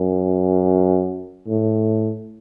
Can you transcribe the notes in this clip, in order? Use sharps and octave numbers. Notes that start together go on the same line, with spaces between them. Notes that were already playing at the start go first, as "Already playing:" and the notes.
Already playing: F#2
A2